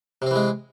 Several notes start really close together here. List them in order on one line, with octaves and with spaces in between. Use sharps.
C3 C4 E3 G#3